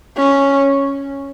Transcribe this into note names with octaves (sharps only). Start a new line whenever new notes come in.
C#4